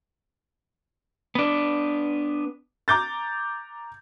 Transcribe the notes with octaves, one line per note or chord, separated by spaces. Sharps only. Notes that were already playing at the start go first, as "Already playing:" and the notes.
B3 D4
A#5 D6 G6 A6